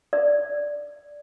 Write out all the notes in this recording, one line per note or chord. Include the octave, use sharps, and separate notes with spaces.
D5